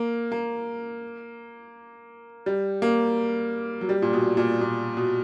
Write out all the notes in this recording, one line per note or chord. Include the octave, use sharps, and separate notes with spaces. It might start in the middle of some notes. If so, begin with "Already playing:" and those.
Already playing: A#3
A#3
G3
A#3
F#3
G3
A#2
B2
A#2
A#2
B2